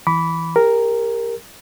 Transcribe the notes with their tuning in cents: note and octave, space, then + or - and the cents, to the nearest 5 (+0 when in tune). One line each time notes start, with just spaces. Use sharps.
E3 +0 B5 +0 D6 -30
G4 +35 A#4 +0